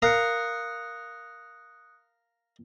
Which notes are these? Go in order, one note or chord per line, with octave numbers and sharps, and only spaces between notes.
A#4 F5 D#6 F#6 C#7